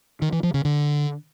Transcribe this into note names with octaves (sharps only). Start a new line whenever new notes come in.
D#3
E3
F3
C#3
D3